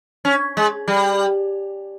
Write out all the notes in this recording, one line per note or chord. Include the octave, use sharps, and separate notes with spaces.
C#4
G#3
G3